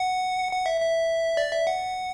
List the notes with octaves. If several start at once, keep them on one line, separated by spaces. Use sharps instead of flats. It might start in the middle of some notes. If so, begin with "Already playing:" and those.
Already playing: F#5
F#5
E5
E5
D5
E5
F#5